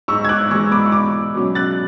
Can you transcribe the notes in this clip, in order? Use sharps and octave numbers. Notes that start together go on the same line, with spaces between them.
G#2 C#6 E6
G#6
D6 F#6
E3 G#3 C#6 E6
B5 D6
C#6
B1 B5 D6
B2 F#3 C#4
F#6 A6